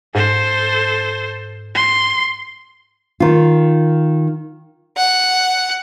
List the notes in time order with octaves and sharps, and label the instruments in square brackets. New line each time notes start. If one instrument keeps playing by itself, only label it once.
[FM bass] G#2 [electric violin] A4 C5
[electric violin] C6
[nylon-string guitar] D#3 F4
[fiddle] F#5